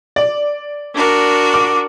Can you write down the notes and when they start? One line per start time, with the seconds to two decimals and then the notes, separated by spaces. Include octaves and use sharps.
0.16 D5
0.94 D4 F#4 A#4
1.54 D6